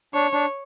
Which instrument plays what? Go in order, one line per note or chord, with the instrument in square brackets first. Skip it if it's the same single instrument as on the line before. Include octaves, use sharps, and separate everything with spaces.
[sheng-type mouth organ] D4 [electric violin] C#5
[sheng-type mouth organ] D4